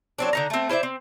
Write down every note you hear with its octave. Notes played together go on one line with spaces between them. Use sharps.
F#3 C4 D4
D3 D#4 A#5
A3 C4
E4 C5 D5 E5
C4